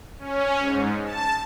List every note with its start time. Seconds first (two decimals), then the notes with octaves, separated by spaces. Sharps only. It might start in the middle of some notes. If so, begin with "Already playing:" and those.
0.19 C#4
0.60 G#2
1.05 A5